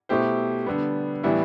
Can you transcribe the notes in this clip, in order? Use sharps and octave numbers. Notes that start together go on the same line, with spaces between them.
B2 A3 E4 G4 C5
D3 G3 B3
A2 E3 G3 B3 E4